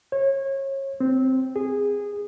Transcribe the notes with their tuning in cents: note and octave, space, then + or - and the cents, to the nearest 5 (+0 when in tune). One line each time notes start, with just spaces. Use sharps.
C#5 -30
C4 -5
G#4 -15